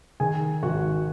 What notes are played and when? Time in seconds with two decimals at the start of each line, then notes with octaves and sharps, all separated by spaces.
0.20 D#3 G#4 G#5
0.63 G#1 F#4 F#5